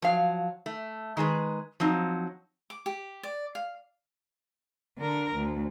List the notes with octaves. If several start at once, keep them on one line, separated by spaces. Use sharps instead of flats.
F3 F#3 F5
A3
D#3 G#3 G#4 B4
F3 F#3 C4 D#4
D6
G4
D5
F5
D3 A#4
D2